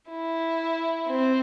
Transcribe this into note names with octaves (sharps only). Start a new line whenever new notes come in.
E4
C4